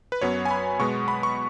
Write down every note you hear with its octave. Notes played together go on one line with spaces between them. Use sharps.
B4
F#2 F#3 B3 C#5
G#5
B5
B2 G#3 B3 C#6
B5
C#6